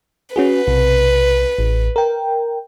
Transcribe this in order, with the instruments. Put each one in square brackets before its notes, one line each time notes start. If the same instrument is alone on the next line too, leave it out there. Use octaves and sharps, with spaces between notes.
[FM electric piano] C#4 F#4 G#4 [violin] B4
[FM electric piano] B1 C3
A1
A#4 G5